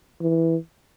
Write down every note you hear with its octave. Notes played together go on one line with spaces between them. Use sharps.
E3